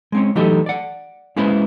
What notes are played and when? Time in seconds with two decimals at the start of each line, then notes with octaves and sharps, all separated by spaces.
0.12 G#3 C4 C#4
0.35 E3 F#3 A3 D#4 G4 A4
0.66 D5 F#5
1.36 G#3 A#3 C#4 E4 B4 C5